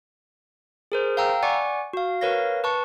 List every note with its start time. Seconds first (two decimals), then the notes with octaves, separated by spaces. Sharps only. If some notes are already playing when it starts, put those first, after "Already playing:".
0.92 G#4 A#4 C5
1.17 F5 G5 A#5 E6
1.43 D5 F#5 G#5 C#6 D6
1.93 F#4 F5
2.21 A#4 B4 C#5 F5 A#6
2.64 B4 A5 C#6